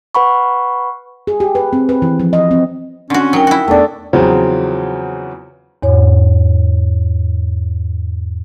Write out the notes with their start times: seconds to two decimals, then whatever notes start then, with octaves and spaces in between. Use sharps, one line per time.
0.15 B4 F#5 B5 C#6
1.27 G#4
1.40 G4
1.55 B4
1.73 C4
1.89 B4
2.02 E3
2.20 F3
2.33 D#5
2.51 C4
3.10 D3 C4 C#4 F#4
3.33 F#3 D#4 A#4 G5
3.47 E4 F#4
3.68 E2 A3 D4
4.13 E2 C#3 F3 F#3 C4
5.83 E2 G#2 C#5